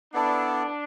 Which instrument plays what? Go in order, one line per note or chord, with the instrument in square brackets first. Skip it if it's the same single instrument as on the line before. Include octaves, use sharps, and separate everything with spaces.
[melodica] B3 E4 A4 D5 [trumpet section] D4